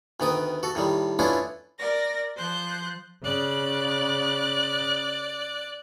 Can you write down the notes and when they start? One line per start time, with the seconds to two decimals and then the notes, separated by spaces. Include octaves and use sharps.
0.20 D2 D#3 B3 G5 D#6
0.63 F#4 A4
0.75 A2 D#3 G3
1.19 A3 B3 C#4 D4 E4 F4
1.78 A#4 D5 A#6
2.35 F3 C5 F#6 G6
3.24 C#3 D5 F#6